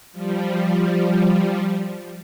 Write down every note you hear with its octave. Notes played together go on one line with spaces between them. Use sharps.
F3 G3